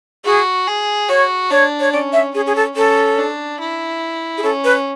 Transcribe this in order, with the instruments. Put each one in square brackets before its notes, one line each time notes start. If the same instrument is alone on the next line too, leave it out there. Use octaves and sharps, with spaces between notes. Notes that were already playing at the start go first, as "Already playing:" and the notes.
[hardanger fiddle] F#4 [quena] G#4
[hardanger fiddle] G#4
[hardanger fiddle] F#4 [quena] C#5
[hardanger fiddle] D4 [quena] C#5
[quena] C#5
[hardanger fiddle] C#4 [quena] D5
[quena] E5
[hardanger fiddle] C#4 [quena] G#4
[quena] G#4
A4
[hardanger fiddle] C#4 [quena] A4
[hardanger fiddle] D4
E4
[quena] G#4
[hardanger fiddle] C#4 [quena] A4
[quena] B4